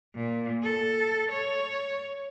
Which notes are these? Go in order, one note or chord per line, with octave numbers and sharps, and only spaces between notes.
A#2
A4
C#5